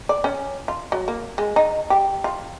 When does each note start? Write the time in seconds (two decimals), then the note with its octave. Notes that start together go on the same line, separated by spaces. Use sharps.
0.09 D5
0.24 C#4
0.68 F4
0.92 F#3
1.08 A#3
1.38 G#3
1.56 D#4
1.90 G4
2.24 F4